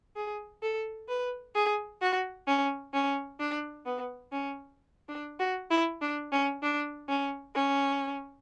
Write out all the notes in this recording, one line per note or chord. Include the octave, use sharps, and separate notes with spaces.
G#4
A4
B4
G#4
F#4
C#4
C#4
D4
B3
C#4
D4
F#4
E4
D4
C#4
D4
C#4
C#4